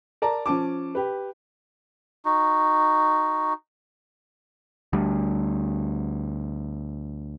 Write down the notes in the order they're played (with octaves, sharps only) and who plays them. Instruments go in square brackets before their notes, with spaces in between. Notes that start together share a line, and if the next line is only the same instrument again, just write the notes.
[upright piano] A#4 D5 A5 A#5
F3 C#4 A5 D6
G4 B4
[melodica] D#4 F#4
[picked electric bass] D2 G3